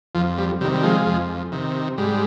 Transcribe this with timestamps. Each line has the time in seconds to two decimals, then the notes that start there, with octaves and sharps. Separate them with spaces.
0.15 F2 F3
0.38 G3
0.61 C3 G3
0.64 D#3
0.74 G3
0.83 F3 G#3
1.06 F2
1.52 C3 D#3
1.98 G#2 G3